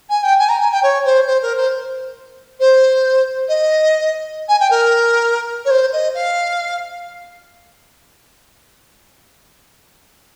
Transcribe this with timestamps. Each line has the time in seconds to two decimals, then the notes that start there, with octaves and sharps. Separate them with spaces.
0.09 G#5
0.23 G5
0.39 G#5
0.49 A#5
0.60 G#5
0.72 G5
0.82 C#5
1.05 C5
1.27 C5
1.42 A#4
1.56 C5
2.59 C5
3.48 D#5
4.48 G#5
4.60 G5
4.70 A#4
5.65 C#5
5.70 C5
5.92 D#5
6.14 F5